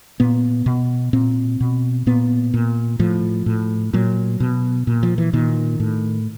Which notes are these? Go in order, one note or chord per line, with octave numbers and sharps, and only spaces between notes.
A#2 B3
B2
A#2 C4
B2
A#2 B3
A#2
A2 F3
A2
A#2 F#3
B2
A#2
F3
E3
A#2 D#3
A2